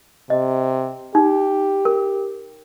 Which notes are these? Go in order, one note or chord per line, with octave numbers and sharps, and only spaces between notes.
C3 D#5
D#4 G4
A#4